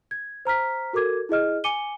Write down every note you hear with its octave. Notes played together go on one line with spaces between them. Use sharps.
G#6
C5 A#5 F6 B6
F#4 A4 A#4 D6 G#6
E4 G#4 D#5 F6
G#5 D6 C#7 D#7 G7